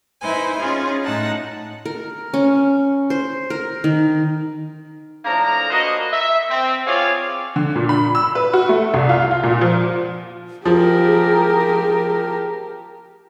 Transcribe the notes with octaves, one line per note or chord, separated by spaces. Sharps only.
D#4 E4 B4 C5 G#5
C#4 D#4 F4 G#4
A2 D#4 F#5 A5 A#6
A#4
C#4
C5
A#4
D#3
A2 F3 A#3 D4 A#5
A#3 F#4 B4 C5 D#5
E5
C4
C4 F4 G#4 C#5 D5 F5
D3
A#2
B5
E6
B4
F#4
A3
C2
F4
F4
A#2
F3
F3 G4 G#4 A#4